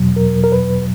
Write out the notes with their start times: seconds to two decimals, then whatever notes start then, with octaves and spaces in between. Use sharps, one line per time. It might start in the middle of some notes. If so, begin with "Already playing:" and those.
Already playing: E2 B2 F#3
0.16 A#4
0.44 A#4
0.52 B4